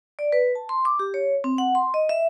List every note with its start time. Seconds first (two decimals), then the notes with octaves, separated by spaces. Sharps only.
0.19 D5
0.32 B4
0.55 A5
0.69 C6
0.85 D6
0.99 G4
1.14 C#5
1.44 C4
1.58 F#5
1.75 C6
1.94 D#5
2.09 E5